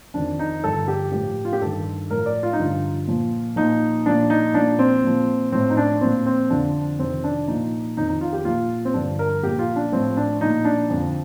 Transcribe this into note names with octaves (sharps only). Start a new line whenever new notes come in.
F2 D#3 D4
D#4
G2 D3 F3 A4
G4
A2 F3 G4
F4
G4
G2 D#3 A4
A2 F3 A#4
D5
F4
D#4
G2 D3 F3 F4
A#2 F3
A#2 F3 D#4
A#2 F3 D4
D#4
A#2 F3 D4
C4
A#2 F3
A2 F3 C4
D#4
D4
A#2 F3 C4
C4
F2 D3 F3 D4
F2 C3 D#3 C4
D4
A#2 F3 D#4
F2 D#3 D#4
D#4
F4
G4
A#2 F3 F4
C4
G2 D3 F3 D4
A#4
A#2 F3 G4
F4
D4
A2 F3 C4
D4
A#2 F3 D#4
D4
F2 D3 F3